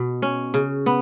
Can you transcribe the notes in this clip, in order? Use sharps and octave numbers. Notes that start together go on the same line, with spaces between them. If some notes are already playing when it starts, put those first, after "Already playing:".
Already playing: B2
C#4
C#3
B3